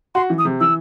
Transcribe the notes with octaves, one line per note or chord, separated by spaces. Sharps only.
F#4 C6
E3
D#6
C3
E3 E6